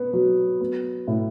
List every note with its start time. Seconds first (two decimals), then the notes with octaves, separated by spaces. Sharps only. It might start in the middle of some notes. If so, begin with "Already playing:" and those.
Already playing: B3
0.13 F#3
0.61 B3
1.07 A2